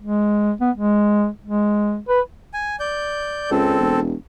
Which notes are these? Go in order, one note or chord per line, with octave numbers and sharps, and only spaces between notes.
G#3
B3
G#3
G#3
B4
G#5
D5 G6
C#2 C4 A4
E1